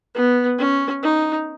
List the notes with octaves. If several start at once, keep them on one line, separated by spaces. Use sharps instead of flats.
B3
C#4
D#4